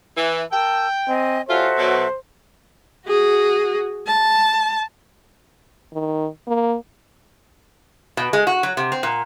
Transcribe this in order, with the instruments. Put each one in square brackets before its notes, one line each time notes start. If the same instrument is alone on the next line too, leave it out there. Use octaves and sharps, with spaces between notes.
[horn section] E3
[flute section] A#4 A5 E6 [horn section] G5
[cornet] C4 [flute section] D#5 G#5
[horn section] G3 C#4 F4 [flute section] F#4 A4 E5 [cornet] C5
[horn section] B2 F#3
[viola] F#4 G#4
A5
[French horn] D#3
A#3
[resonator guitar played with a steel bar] B2
G#3
F#4
F#3
C3
C4
A#2